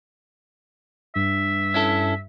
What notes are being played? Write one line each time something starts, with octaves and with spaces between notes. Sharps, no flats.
G2 E5
C#4 E4 A4